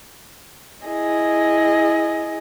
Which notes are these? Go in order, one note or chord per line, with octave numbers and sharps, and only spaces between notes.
E4 G#4 D#5